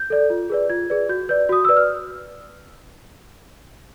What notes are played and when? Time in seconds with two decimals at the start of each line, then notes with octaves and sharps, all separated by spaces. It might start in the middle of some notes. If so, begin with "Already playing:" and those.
Already playing: G6
0.10 A4 D5
0.30 F4
0.50 G#4 B4 D5
0.70 F4 G#6
0.90 G#4 B4 D5
1.09 F#4 G6
1.29 B4 D5 G6
1.49 F#4 D#6
1.65 B4 D5 E6
1.77 F6